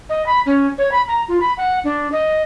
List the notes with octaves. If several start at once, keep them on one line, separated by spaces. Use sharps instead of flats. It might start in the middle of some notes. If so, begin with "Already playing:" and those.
D#5
B5
C#4
C#5
B5
A#5
F4
B5
F#5
D4
D#5